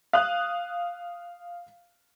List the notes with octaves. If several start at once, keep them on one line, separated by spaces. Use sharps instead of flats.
F5 D#6 F#6